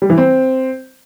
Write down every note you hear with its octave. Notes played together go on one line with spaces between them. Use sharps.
G3
E3
C4